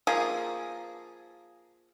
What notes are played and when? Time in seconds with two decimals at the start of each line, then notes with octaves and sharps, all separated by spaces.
0.07 F3 A#3 G#4